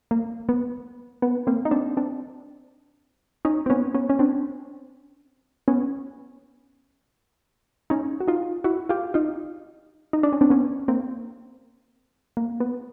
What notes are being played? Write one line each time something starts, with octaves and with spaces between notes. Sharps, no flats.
A#3
B3
B3
A#3 C4
D#4
C4 D4
C4 D4
C#4 D#4
C4
B3 C#4
B3 C#4
C#4
C4 D4
B3 C#4
C#4 D#4
F#4
D#4 F4
E4 F#4
F4 G4
D#4 F4
D#4
D4
C#4
C4 D4
B3 C#4
A#3 C4
A#3
B3